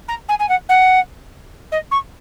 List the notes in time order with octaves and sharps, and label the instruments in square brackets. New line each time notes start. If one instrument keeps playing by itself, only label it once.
[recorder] A#5
G#5
G#5
F#5
F#5
D#5
C#6